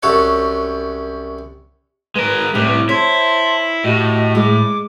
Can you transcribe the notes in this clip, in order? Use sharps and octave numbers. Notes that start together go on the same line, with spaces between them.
C2 F#2 A4 C#5 F#5
G#3 A#4 B4
A2 C3 G3
E4 C5 C#5 A5 C6
A2 F#4 G4 D#5
G#3 D6